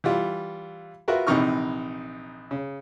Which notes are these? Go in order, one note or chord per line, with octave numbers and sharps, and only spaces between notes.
E3 G3 F4
F4 F#4 A#4 B4 E5
A#1 C3 E3 D#4 C#6 F6
C#3